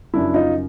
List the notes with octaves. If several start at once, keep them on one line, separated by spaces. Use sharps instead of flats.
F#2 C#3 F3 D4 E4
D#4 F4